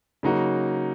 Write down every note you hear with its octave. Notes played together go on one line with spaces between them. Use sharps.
C#3 F#3 A#3 D#4 F#4